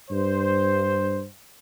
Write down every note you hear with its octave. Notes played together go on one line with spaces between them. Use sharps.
G2 C5